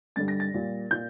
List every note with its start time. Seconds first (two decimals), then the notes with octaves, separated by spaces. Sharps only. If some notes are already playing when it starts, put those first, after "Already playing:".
0.16 G2 D3 G3 A6
0.28 A#6
0.40 A6
0.54 A#2 G3
0.91 A#2 G6